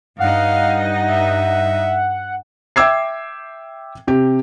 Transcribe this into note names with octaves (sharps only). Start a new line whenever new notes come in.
G2 D#4 D#5 F5 F#5
E5
E5 G5 D6 E6 G#6 C7
C3 G4